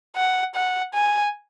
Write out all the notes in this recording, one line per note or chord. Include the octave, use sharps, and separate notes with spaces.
F#5
F#5
G#5